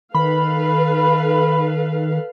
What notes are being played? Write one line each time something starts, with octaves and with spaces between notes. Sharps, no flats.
D#3 A4 B4 F5 B5